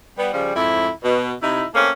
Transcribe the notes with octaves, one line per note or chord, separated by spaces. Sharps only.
G3 B3
C#3 F3 G3
F2 G#2 E4
B2
C3 D#4 E4
A3 A#3 C4 C#4